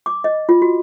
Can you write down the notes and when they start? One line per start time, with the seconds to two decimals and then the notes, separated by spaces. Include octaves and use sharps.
0.06 D6
0.24 D#5
0.49 F4
0.62 F#4